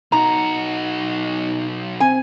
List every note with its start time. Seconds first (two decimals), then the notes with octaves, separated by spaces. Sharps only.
0.12 B1 D#4 F#4 A#5
2.00 C4 G#5